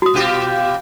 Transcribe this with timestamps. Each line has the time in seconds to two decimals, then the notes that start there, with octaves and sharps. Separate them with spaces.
0.02 F#4 D#6
0.14 B2 F4 G4